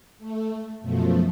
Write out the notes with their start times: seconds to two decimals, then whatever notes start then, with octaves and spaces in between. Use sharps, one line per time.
0.18 A3
0.81 F#2 B2 F3 A3